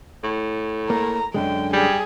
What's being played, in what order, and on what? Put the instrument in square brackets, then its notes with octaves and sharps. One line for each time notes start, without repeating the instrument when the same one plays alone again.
[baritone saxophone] A2
[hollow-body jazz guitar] A#3 [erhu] A#5
[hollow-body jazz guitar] F#2 D3 G#3 [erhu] G5
[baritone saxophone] G3 [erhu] G#4